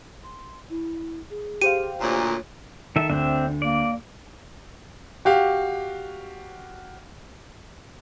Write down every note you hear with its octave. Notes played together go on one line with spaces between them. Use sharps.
C6
E4
G#4
G4 C5 F5 D#7
D2 A#2 C#5
D#3 A4 E5
D2 C4 D4 E5
A#3 D5
F#4 G4 F5